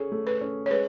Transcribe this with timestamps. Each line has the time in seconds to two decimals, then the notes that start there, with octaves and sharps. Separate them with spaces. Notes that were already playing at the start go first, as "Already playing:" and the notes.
Already playing: C#4 G#4 A4
0.12 A3
0.27 B4
0.41 C#4
0.66 C#5
0.71 G#3 B4